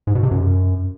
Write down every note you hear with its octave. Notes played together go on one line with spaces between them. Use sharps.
G#2
B2
C3
F#2